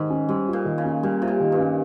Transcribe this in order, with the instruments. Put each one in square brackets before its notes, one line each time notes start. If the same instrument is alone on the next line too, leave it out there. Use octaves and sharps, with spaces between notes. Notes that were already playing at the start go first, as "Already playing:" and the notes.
Already playing: [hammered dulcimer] G#2 [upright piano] D#3
[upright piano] C#4
[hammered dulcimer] G#2 [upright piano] G3
[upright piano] F4
[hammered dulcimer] A#2
[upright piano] D#3
[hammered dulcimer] C#3
[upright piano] C#4
[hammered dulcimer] A#2 [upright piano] G3
[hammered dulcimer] C3 [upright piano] F4
[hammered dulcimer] A#2
[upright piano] D#3
[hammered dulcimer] G2
[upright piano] C#4